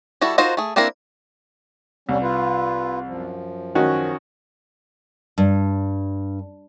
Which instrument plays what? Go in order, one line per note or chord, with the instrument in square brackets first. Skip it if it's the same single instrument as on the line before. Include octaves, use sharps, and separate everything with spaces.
[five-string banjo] G3 E4 F#4 A4
D#4 F4 F#4 A#4 C5
A3 G#4
A#3 C4 D4 E4 A#4
[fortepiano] C2 [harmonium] G3 C#4
[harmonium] F4 B4
F#2 F3
[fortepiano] D#3 C#4 F#4
[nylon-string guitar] G2